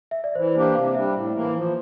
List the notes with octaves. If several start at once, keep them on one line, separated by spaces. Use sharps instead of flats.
E5
D5
E3 C5
A#3 D4 G4 C5
C3 F5
G3 D4 E5
A2
E3 A#3
F3